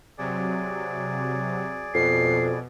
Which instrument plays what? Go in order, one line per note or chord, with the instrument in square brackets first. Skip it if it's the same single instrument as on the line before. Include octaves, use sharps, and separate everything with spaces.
[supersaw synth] C3 F#3 [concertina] G#4 D5
[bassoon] F2 [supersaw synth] B2 [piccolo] C7